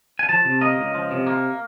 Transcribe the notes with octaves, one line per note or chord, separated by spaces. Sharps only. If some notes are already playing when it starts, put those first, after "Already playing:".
G#5
F3 A5
C3
A#3 D#5
C#2
F3
C3
A#3